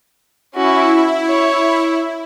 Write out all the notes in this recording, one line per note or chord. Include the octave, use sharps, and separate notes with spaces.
C#4 E4 F#4
C#5